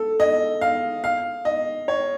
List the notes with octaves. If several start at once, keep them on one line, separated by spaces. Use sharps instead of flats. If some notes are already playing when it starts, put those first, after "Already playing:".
Already playing: A4
D#5
F5
F5
D#5
C#5